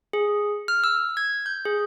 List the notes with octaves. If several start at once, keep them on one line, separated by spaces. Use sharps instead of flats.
G#4
F6
E6
G#6
G6
G#4